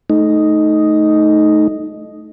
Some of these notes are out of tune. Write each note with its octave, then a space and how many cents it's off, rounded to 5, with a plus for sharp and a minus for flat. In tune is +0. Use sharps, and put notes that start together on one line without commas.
A3 -20 D#4 +0